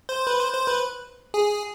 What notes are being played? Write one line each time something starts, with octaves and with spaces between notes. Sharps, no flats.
C5
B4
C5
C5
B4
G#4